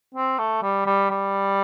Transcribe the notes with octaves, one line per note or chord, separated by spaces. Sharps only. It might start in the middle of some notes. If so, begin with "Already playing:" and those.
C4
A3
G3
G3
G3